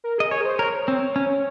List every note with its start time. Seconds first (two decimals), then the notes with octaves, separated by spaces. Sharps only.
0.04 A#4
0.18 G#4 D#5
0.31 G#4 C#5
0.41 A#4
0.45 C5
0.59 A#4 C#5
0.88 C4
1.16 C#4